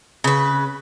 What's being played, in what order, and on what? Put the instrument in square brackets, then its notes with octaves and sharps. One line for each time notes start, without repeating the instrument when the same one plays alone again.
[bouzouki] C#3 B4